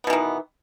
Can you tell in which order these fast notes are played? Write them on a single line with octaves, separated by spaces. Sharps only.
B3 B2 E3 D#3